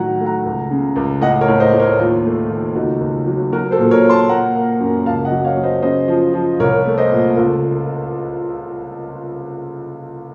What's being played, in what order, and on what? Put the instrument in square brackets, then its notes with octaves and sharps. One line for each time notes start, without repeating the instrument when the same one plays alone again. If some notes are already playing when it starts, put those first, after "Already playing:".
Already playing: [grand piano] A2 D#3 F#3 F#5 A#5
A3
F#5 A#5
C#2
C#3
C#2
A2 D#5 F#5
A#4 C#5
A2
C5 D#5
A2
A#4 C#5
D#2 F4
A3
D#2
C#2 D#4 F#4
C#2
F#3
F#3 F#4 A#4
A4 C5
A#2
A#4 C#5
A#3
A5 C6
A#3 F#5 A#5
A#3
F#2
C#2 F5 A5
D#5 F#5
F#3
C#5 F5
F#3
C5 D#5
C#3 C5 D#5
F3
F3
C2 A#4 C#5
A3
C5 D#5
A#2
C#2 F4 A4